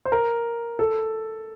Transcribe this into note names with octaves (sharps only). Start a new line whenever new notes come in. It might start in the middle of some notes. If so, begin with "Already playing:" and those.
C5
A#4
A4